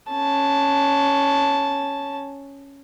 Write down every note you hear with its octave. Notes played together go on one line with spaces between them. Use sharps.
C#4 A5